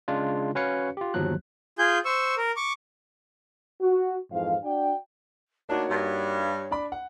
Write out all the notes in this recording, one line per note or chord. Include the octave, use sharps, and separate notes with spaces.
C#3 G#3 D4 F4
C#4 F#4 B4 C#5 F5 C#7
F4 G4
G1 D#2 F3 F#3 F#6
F4 G#4 G#5 G6
C5 C#6 E6
A#4
C#6 D6
F#4
F2 G#2 E3 F5
D4 F#4 D5 G5
D2 A#3 D4 D#4 F#4 C#5
G2
D4 D5 B5
F#5